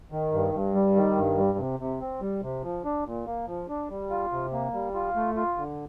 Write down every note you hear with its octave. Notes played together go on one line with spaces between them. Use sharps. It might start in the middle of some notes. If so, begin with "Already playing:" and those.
D#3
G2
G2
G3
D#3
G2
G3
C3
C3
C4
G3
C3
F3
D4
A#2
A#3
F3
D4
G3
F4
C3
A#3
G3
F4
A3
F4
D3